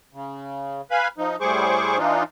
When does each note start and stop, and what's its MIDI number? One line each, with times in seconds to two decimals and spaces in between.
0.13 0.81 49
0.91 1.08 71
0.91 1.08 77
0.91 1.08 80
0.91 1.08 83
1.18 1.36 53
1.18 1.36 63
1.41 1.98 45
1.41 1.98 55
1.41 1.98 68
1.41 1.98 72
1.41 1.98 85
1.41 1.98 86
1.98 2.23 52
1.98 2.23 62
1.98 2.23 63
1.98 2.23 65